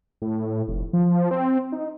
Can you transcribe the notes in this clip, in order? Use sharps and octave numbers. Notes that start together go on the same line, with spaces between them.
A2
A2
F1
F3
C4
D#4